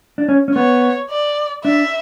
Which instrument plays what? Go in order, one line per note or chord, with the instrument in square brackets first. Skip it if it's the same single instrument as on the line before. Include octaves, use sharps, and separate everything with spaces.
[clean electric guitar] D4
C#4
C#4
[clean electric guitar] B3 [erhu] C#5
[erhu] D5
[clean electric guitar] D4 [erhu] E5